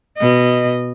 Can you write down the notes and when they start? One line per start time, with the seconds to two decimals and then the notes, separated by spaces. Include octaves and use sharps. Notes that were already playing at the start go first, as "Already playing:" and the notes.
0.18 B2 D#5